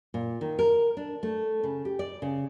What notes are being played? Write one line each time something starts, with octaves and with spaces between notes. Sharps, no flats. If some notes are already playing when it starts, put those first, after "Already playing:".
A#2
D#3
A#4
D4
A3
C#3
G4
D5
C#3